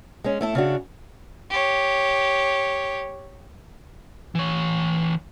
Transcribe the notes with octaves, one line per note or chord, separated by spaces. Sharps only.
G#3 C#4
A3 E4 A4
C#3 D4 F#4
G4 C#5
E3 C#5